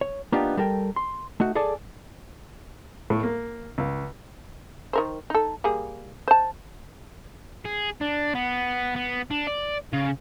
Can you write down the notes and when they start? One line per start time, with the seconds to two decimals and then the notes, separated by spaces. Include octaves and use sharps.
0.01 C#5
0.32 A#3 B3 D4 D#4 F4 G4
0.57 G3 A4 A#4 G5
0.96 C6
1.40 A3 D#4 F#4
1.55 G#4 A4 D5 A5
3.10 A2
3.23 A#3
3.78 C#2
4.93 D#3 A#4 C5
5.30 D#4 A4
5.64 G3 A#3 G#4
6.28 C5 A5
7.65 G#4
8.01 D4
8.35 B3
8.96 B3
9.31 D4
9.47 D5
9.93 C#3